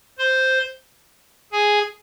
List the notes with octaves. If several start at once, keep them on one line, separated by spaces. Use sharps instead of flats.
C5 C6
G#4 G#5